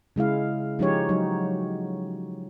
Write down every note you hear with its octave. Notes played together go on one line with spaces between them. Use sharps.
C#3 G#3 E4 F5
F3 G#3 C#4 D#4 G4 C#5
F#3 D#4